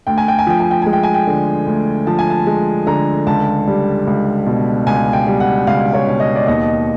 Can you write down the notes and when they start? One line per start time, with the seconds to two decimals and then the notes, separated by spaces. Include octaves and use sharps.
0.07 D2 G5
0.18 G#5
0.28 G5
0.39 G#5
0.47 F3 G5
0.60 G#5
0.71 G5
0.82 G#3 G#5
0.93 G5
1.03 G#5
1.14 G5
1.27 D3
1.67 D2
2.07 F3 A5
2.19 G#5
2.30 A5
2.47 G#3
2.87 D3 A#5
3.27 C#2 A5
3.67 G3
4.07 C#2
4.46 B2
4.87 C#2 G#5
5.13 G5
5.27 G3
5.40 F#5
5.67 C#2 F5
5.93 C#5
6.07 B2
6.20 D#5
6.36 D5
6.47 D#2 D#5